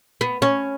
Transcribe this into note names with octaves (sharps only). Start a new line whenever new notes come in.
B3
C#4